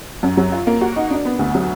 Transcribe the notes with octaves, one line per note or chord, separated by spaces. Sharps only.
F#2
F#3
F4
A#3
F#4
D#4
D4
B3
D2
F#3